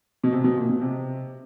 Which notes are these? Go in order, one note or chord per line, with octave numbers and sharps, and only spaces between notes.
B2
C3
B2
A#2
B2
C3